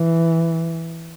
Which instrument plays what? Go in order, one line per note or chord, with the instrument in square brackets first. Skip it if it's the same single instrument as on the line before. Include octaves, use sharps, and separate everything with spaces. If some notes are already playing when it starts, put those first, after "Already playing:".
Already playing: [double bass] E3